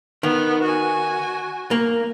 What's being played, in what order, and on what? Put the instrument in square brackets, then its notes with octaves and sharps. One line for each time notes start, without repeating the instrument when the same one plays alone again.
[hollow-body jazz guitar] D#3 [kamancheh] B3
[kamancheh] F#4 G#5
[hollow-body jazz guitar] A#3